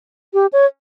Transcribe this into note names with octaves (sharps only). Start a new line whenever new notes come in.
G4
C#5